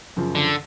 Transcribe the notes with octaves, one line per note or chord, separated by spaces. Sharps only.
F#2 C#3 F3
D3